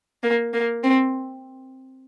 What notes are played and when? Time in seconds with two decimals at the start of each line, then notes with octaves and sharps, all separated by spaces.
0.23 A#3
0.53 A#3
0.84 C4